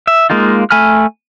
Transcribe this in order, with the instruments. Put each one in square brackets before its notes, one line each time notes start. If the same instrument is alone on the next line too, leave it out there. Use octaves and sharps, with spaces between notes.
[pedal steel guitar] E5
G#3 A#3 D#4 F4
A3 G#5 B5 F6